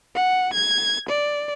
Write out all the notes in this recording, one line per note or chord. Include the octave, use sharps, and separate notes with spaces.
F#5
G#6
D5